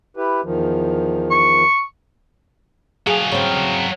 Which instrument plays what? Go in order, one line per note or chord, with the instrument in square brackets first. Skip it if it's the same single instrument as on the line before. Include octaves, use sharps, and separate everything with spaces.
[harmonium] E4 G4 B4
E2 D#3 F3
[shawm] C#6
[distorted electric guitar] F#3 F5 [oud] G#4
[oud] C#3 C4